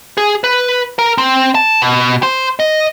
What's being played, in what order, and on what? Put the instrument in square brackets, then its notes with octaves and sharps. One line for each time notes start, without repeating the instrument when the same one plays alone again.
[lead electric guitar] G#4
B4
A#4
C4
A5
B2
C5
D#5